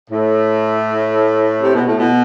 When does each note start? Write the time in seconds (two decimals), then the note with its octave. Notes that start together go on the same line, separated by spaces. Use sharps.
0.10 A2
1.62 C3
1.74 B2
1.87 A2
1.99 B2